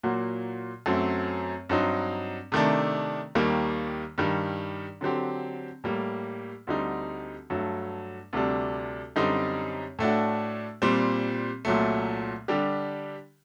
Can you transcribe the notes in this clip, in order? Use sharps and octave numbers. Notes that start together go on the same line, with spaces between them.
A#2 F#3 A#3 F#4
F#2 F#3 A3 C4
G2 F#3 C4 D#4
C3 D#3 A3 D4
D#2 D#3 G3 A#3
G2 D#3 G3
D3 F#3 C4 G4
A2 G3 A#3
D2 D3 G3 C4 D#4
G2 F#3 A3
D2 C3 G3 D4
F#2 D3 G3 C4 D#4
A2 A3 D4 F#4
A#2 G3 C4
C2 A#2 F#3 A3
D3 G3 D4 G4